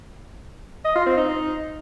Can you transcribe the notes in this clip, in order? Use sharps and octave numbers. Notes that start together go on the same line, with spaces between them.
D#5
F4
C4
D#4